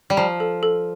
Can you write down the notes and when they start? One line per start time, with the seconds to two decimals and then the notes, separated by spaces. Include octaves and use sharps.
0.10 G3
0.17 F3 A#5
0.40 A4
0.63 A4